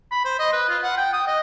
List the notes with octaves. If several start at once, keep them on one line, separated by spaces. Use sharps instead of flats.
B5
C5
D#5
B4
F4
F#5
G5
D#6
D#5